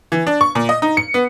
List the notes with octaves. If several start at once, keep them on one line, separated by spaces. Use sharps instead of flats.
E3
D4
C#6
A#2
D#5
D#4
C#7
B3